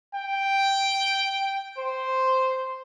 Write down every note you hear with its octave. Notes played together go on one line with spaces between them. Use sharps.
G5
C5